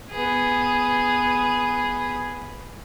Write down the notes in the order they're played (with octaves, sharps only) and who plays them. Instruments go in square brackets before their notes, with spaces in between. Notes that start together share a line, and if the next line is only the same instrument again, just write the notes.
[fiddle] B3 G#4